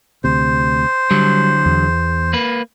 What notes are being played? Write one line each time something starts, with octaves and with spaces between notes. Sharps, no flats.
D2 C3 C5
D3 F#3 G3
E2
A#3 B4